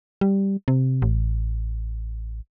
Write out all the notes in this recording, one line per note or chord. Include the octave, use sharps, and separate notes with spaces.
G3
C3
A1